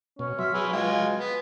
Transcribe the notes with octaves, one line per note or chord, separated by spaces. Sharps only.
B2 C#4
F#3 E5 C6 F6
G#4 B4
G#3 F4 B4 G5 G#5
B3